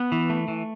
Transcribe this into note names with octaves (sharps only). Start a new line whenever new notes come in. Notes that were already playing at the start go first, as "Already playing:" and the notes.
Already playing: B3
E3
A3
E3